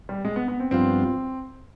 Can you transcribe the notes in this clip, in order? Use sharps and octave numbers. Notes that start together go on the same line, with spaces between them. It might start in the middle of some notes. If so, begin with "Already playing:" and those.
G3
G#3
B3
B3
C4
G2 F3 B3 C4 F4